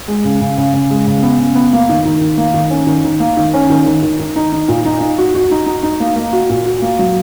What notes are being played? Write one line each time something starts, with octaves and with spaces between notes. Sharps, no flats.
G#3
C#3
C#3
C#3
C#3
G#3
C#3
B3
C#3
B3
A#3
D#3
D#3
D#3
A#3
D#3
C#4
D#3
D#3
A#3
D#3
C#4
D#3
D#3
D#3
D#3
D#4
D#4
A#2
D#4
D#4
F#4
F#4
D#4
D#4
D#4
A#3
A#3
F#4
A#2
F#4
A#3
F#3